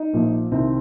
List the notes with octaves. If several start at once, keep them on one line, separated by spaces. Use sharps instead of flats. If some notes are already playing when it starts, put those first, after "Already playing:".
Already playing: D#4
A#1 A#2 F3
C2 C3 D#3 C4